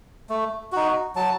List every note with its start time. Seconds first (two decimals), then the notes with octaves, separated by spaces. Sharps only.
0.29 A3
0.72 D#4 F#4
1.16 F#3 A5